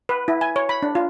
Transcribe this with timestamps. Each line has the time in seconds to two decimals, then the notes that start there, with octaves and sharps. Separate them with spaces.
0.09 B4
0.28 E4
0.41 G#5
0.56 C#5
0.69 B5
0.82 D4
0.95 F4